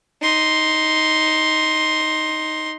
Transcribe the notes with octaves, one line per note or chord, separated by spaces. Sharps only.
D#4 C6